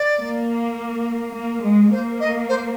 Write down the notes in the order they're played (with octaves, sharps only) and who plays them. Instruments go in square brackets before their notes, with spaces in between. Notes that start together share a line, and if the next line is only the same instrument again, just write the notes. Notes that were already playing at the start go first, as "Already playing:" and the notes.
Already playing: [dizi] D5
[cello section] A#3
A#3
G#3
[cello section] A#3 [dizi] C5
[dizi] D#5
C5